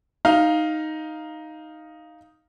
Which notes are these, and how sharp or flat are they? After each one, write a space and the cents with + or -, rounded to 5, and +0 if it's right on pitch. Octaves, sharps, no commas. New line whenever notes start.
D#4 +0 F5 +0